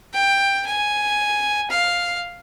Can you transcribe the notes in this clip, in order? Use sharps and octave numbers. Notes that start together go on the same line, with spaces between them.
G5
G#5
F5